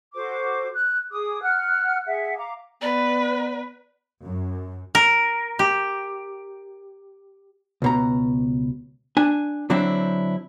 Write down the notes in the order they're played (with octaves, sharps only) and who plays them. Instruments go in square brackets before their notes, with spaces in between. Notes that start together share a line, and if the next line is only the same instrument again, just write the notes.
[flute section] F#4 A4 C5 D6
F#6
G#4 D6 D#6
F#5 F6 F#6
G#4 E5 F#5
F5 A#5 D6
[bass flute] B3 [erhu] B4 [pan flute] D5
[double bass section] F#2
[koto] A#4
G4
[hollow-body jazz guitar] C#2 B2 A#5
D4 G#5
D3 F#3 C4 D4 E4